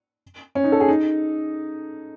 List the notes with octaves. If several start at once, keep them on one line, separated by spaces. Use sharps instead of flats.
C#4
D#4
A4
G#4
D#4